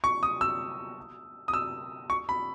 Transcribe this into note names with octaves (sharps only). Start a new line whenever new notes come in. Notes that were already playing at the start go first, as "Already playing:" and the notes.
C#6
D#6
E6
D#6
E6
C#6
B5